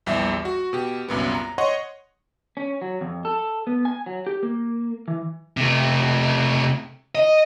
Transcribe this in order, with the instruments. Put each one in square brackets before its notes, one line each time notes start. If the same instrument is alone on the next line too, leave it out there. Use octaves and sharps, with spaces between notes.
[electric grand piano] A#1 E2 G3 G4 E5
F#4
B2 G4
C2 F#2 A#2 B3
A#5
C#5 D#5 F#5 C6 C#6
[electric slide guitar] C#4
F#3
F2
A4
B3
G#5
F#3
G4
A#3
E3
[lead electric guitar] C3 A3
D#5